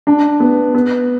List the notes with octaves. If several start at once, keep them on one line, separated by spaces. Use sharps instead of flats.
D4
B3
B3